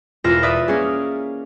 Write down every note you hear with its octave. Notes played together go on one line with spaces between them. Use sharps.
E1 E2 F4 A#4 A#6 E7
B4 D5 E5 D#6 A6
A#3 C#4 G#4